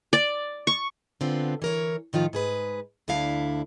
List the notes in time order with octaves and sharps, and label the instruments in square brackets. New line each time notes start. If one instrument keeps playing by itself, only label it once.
[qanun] D5
C#6
[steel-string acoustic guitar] D3 B3 C4 F4
E3 A#4 C#5
A2 D#3 F3 F4
G#2 G#4 B4
D2 D3 D4 E4 F5